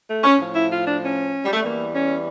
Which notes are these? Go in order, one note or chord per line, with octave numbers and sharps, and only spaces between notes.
A3
C#4
A2 F3
E4
F4
D4
C#4
G3
A3
E2 E3 G3 A#3
C#4